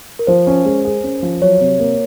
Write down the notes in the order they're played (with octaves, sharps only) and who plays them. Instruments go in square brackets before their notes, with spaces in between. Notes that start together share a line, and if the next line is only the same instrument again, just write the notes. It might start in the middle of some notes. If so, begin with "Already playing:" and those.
[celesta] A#4
[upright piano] F3 [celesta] C5
[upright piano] C#4
G#3
G#4
C#4
F3
[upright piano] F#3 [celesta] C#5
[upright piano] C3
A#3